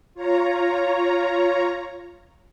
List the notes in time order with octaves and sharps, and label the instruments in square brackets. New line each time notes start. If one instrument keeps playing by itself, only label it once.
[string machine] F4 C#5 A#5